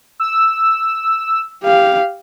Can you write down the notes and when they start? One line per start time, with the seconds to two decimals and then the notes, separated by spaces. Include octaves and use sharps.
0.20 E6
1.63 G4 F5